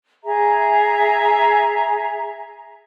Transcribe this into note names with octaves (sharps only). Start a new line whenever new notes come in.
G#4 E5 A#5